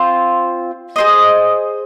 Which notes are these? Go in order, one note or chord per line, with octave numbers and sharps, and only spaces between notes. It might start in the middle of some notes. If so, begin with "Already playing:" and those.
Already playing: C4 F4 C5
G#4 C5 D#5